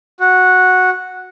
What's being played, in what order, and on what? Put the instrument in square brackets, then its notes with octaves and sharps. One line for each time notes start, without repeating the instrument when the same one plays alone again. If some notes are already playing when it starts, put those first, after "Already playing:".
[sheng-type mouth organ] F#4